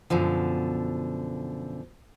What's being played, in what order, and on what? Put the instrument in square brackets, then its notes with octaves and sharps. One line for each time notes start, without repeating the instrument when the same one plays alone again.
[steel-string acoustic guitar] F#2 B2 D3 F3